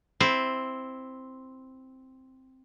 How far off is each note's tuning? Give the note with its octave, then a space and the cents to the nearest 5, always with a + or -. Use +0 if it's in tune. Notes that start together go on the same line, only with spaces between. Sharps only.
C4 +0 E4 +0